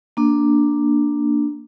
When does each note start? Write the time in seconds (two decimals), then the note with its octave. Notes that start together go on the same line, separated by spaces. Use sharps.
0.17 A#3 D4